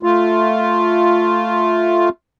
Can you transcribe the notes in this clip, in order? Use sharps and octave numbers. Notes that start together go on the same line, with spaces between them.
A3 F4